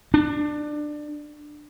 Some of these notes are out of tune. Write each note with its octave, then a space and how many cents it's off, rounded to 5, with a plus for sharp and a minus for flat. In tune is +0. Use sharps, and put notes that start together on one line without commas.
D4 +20